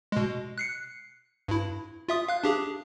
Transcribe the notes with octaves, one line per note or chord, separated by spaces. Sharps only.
B2 G#3
F#6 C7 C#7
G2 E4
F4 E5 D#6
F5 F#6
D4 G4 G#4